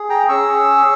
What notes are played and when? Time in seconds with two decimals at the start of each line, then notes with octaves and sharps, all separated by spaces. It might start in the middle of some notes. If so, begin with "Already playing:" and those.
Already playing: G#4
0.10 G5 A#5
0.29 C#4 G#4 C#6 E6